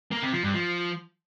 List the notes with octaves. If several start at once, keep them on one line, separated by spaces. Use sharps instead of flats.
A#3
C3
F3
G2
F3